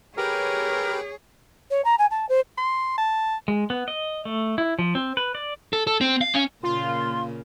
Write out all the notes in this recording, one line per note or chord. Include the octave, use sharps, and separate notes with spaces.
G4 G#4 A#4 B4 C#5 G5
C#5
A#5
G#5
A5
C5
C6
A5
G#3
B3
D#5
A3
E4
F3
C4
B4
D5
A4
A4
C4
F5
C#4
A#2 C#3 A#3 F4 C6